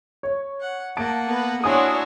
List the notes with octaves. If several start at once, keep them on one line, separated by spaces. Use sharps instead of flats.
C#5
F#5
A#3 F#5 A5 D7
B3 B4
D4 E4 F#4 C#5 G#5 C6 D#6